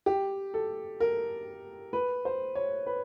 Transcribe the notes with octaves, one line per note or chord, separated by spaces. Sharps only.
G4
A4
A#4
B4
C5
C#5
B4